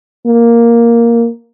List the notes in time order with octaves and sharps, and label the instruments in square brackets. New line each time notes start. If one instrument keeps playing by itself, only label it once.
[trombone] A#3